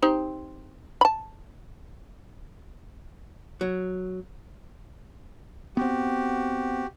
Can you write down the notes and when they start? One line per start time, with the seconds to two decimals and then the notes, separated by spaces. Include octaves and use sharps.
0.02 C4 D#4 G4
1.01 A5 B5
3.61 F#3
5.77 B3 C4 F#4 G4